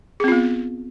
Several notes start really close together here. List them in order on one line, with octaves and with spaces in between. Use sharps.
G#4 C4 F4 B3